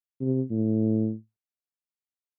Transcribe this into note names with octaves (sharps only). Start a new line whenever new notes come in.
C3
A2